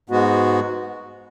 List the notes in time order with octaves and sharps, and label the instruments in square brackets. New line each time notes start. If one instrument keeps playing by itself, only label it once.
[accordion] G#2 G#3 B3 F#4